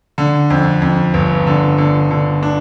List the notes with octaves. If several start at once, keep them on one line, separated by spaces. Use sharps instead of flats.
D3
F2
F2
G1
D3
D3
D3
D4